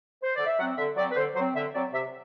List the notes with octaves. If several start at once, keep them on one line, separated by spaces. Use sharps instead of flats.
C5
D3 D5
E5
F#3 C4 F#5
D3 E5
F#3 C4 D5
B4
D3 C5
F#3 C4 C5
D3 E5
F#3 C4 D5
C3 E5